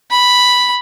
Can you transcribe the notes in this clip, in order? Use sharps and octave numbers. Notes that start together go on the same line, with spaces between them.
B5